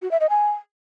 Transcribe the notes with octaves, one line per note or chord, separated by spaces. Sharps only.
F#4
E5
D#5
G#5